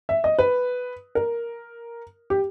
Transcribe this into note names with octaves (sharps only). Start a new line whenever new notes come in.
E5
D#5
B4
A#4
G4